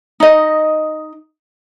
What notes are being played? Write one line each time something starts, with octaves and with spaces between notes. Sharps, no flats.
D#4 D#5